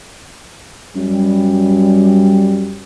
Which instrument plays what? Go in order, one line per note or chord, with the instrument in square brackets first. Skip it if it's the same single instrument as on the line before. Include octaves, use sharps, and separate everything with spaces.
[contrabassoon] F#2 [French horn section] G3